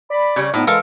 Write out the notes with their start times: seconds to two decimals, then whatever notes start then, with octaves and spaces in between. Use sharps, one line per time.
0.10 D5 B5
0.36 C#3 G3 C#4
0.54 A2 F3 B3 D#4
0.67 E3 G#3 A4 A#4 F5